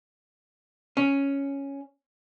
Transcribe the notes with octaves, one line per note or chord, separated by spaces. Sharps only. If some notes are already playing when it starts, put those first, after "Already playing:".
C#4